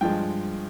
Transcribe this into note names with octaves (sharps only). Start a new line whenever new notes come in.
G2 F3 G#3 G5